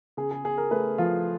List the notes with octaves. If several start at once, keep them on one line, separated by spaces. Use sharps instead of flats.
C#3 G#4
G#4
C#3 G#4
A#4
A3 B4
F3 F4